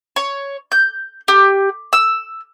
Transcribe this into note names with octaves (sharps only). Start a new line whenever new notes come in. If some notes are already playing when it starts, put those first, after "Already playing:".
C#5
G6
G4
E6